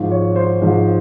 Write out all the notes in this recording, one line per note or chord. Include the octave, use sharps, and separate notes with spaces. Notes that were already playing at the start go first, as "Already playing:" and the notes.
Already playing: G#1 G#2 F3
C#5
C5
G#1 G#2 F3